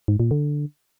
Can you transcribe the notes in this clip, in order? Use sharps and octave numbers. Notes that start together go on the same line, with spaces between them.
G#2
A#2
D3